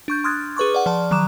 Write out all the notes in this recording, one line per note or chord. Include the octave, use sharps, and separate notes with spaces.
D4 C#6 G6
C6 D#6 F6 F#6 G#6 A6
G#4 B4 C#6 D6
D5 F#5
F3 D5 A5
D#3 F#3 A#5 D6 E7